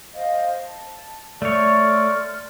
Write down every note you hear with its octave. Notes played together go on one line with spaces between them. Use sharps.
C5 D#5 F5
A5
A3 A4 C#5 D5 C6 F6